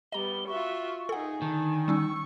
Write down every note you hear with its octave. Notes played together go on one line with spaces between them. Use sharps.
G3 B3 D#5 A#5 G7
F4 F#4 E5 C#6
D#4 G#4 A4 F#5
D3 D#3 G#5 A5
G3 C#4 D#4 C#6 E6